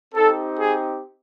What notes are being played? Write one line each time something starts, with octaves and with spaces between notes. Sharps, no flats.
C4 D#4 G4 A4
G#4